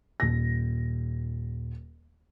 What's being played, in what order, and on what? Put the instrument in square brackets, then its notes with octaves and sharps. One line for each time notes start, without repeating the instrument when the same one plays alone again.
[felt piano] D#1 A#6